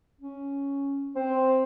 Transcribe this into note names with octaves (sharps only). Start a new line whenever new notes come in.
C#4
C4 C5